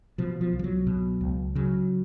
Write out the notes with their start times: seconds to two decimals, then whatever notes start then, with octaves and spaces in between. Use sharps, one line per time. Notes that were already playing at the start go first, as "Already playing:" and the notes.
0.18 B2 F3
0.41 F3
0.53 C2
0.59 F3
0.64 F#3
0.87 B2
1.21 C#2
1.55 C#3 F#3